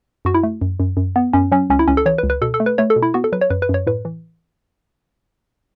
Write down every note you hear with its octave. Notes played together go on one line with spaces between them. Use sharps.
F#2 F#4
E4
A3
F#2
F#2
F#2
B3
F#2 C#4
F#3 C#4
C#2 C#4
E4
C#2 C#4
A4
E3 C#5
B4
C#2
B4
B2 A4
A4
A3
B4
A3 C#5
A4
B2
E4
B3 F#4
A4
F#3 B4
C#5
F#2 B4
B4
F#2
C#5
A2 B4
E3